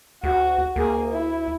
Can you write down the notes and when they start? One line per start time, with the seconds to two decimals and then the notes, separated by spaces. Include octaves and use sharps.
0.24 D2 F#4
0.76 D2 A#3 G#4
1.12 E4